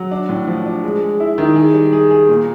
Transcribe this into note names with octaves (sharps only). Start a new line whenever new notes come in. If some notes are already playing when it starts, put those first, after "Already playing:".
Already playing: F#3
D4
A2
F3
D4
G#3
G#3
E4
D#3
G#4
G3
G#4
G#4
A#2